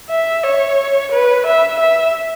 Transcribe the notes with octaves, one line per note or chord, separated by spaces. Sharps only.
E5
C#5
B4
E5
E5